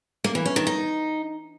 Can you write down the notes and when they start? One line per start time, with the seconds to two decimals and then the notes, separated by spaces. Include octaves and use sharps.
0.24 A#3
0.35 E3
0.46 C#4
0.56 D#3
0.67 D#4